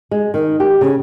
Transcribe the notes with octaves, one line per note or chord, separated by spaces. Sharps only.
G#3
D#3
G4
C#3